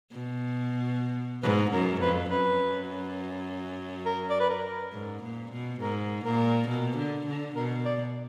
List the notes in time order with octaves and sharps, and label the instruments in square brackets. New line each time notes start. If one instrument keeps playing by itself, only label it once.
[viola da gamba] B2
[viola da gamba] G#2 [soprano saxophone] B4
[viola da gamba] F#2 [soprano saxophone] A#4
[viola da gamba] F2 [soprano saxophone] B4
[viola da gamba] F#2 [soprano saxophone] B4
[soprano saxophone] A#4
D5
B4
A#4
[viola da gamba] G#2
A#2
B2
[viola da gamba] G#2 [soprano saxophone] A#4
[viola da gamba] A#2 [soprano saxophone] A#4
[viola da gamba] B2
D3
D3
[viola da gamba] B2 [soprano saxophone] A#4
[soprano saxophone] D5